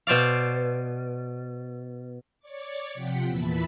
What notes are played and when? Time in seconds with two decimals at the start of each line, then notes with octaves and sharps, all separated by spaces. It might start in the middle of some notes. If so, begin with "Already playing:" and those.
0.07 B2 C5 D5 F5
2.40 C#5 D5 C#6 D6
2.94 C3 F3 F#5 G5 B6 C#7
3.26 E2 A#2 E3 E5 A5 B5